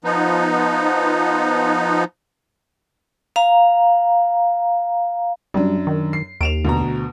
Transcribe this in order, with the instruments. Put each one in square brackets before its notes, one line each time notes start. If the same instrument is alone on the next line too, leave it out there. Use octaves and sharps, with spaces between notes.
[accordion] F3 B3 D#4
[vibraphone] F5 A#5
[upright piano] F#2 D4 [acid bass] G3
[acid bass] D#3
[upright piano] C7
[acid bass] D#2 [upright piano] D7 E7 F7
[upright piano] D2 B2 A#5